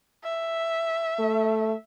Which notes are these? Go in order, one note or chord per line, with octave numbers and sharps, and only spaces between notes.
E5
A3